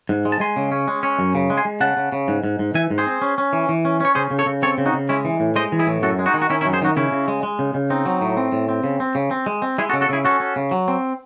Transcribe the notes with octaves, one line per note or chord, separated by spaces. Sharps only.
G#2
G#3
A5
G#3 G#5 C6
C#3
C#4
G#3
C#4
F#2
C#3
G#3
G#5 C6
G#3
C#3 F#5 A5
C#3
C#3
G#2
G#2
G#2
E3 E5 G#5
G#2
G#4 C5
C4
C#4
C#4
E3
E3
C#4
C#4 C#5
C#3 G#4 C5
C#3
A4 C#5
C#3
C4 A4 C#5
C#3
D#4 F#4
C#3
G#3 C#4 E4
E3
A2
G#3 C5 D#5
E3
E4 G#4
A2
F#2 F#4 A4
G#3
D#4 F#4
D#3
F#4
D#3 C#4 E4
C#4 E4
F#2
G#4 C5
D#3 D#4 F#4
C#3 C#4 E4
C#3
G#3
G#3
C#3
C#3
C4 D#4
F#3
A2
C4
A2
C4
C#3
C4
C#3
C4
G#3
C4
G#3 E4 G#4
F#4 A4
C#3
F#4 A4
C#3 E4 G#4
C#4 F#4 A4
C#4
C#3
F#3
C4